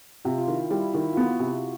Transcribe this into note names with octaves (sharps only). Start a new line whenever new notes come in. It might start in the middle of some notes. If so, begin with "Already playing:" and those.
C3 F4
F4
D#3 E4
G3 E4
D#3 E4
F4
B3 F#4
C3